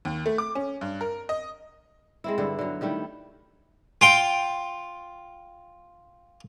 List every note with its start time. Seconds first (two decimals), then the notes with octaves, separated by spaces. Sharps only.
0.05 D#2
0.26 A3
0.38 D6
0.55 C#4
0.81 G2
1.01 A#4
1.29 D#5
2.24 G#3 C4 E4
2.38 G2 D3 B3 E4
2.59 D3 F#3
2.81 D#3 G3 A3 E4
4.01 F4 G5